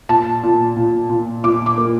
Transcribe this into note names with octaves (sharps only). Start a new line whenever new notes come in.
A#2 A5
A#2
A#2
A#2
A#2 D6
D6
A#3